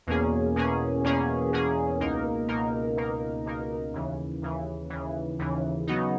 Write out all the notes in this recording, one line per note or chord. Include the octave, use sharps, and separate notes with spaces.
E2 B2 A#3 C#4 G#4
E2 B2 A#3 C#4 G#4
E2 B2 A#3 C#4 G#4
E2 B2 A#3 C#4 G#4
C#2 B2 A#3 D#4 A#4
C#2 B2 A#3 D#4 A#4
C#2 B2 A#3 D#4 A#4
C#2 B2 A#3 D#4 A#4
D#2 C#3 E3
D#2 C#3 E3
D#2 C#3 E3
D#2 C#3 E3
C#3 F#3 B3 D#4